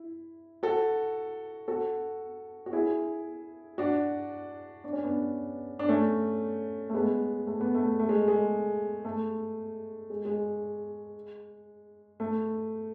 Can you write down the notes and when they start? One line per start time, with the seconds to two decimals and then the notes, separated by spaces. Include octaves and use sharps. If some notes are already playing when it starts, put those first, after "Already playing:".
Already playing: E4
0.63 F#4 A4
1.68 F#4 A4
2.66 F#4
2.73 E4 G#4
3.78 D4 F#4
4.84 D4
4.93 C#4
5.04 B3 D4
5.79 D4
5.88 A3 C#4
6.90 A3
6.94 G#3 B3
7.47 A3
7.61 B3
7.75 A3
8.00 A3
8.09 G#3
8.28 G#3
9.05 A3
10.10 G#3
10.25 G#3
12.20 A3